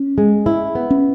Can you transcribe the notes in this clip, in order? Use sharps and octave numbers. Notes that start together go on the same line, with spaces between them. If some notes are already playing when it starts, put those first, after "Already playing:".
Already playing: C#4
G#3
E4
B3
C#4